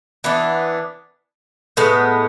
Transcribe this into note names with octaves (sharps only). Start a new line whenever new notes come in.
E3 B3 D4
A2 G#3 B3